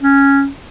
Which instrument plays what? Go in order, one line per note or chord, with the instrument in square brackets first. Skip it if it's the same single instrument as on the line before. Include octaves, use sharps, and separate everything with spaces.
[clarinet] C#4